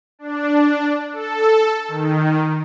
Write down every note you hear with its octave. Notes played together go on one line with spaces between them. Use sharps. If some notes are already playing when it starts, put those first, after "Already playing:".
D4
A4
D#3